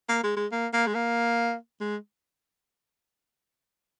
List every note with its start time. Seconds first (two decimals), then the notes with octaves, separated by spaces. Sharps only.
0.09 A#3
0.23 G#3
0.36 G#3
0.52 A#3
0.73 A#3
0.87 G#3
0.94 A#3
1.81 G#3